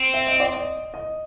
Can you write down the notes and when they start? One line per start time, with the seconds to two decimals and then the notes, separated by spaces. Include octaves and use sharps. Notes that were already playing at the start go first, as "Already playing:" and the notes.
Already playing: C4
0.14 E5
0.27 D#5
0.40 D5
0.54 D#5
0.94 D#5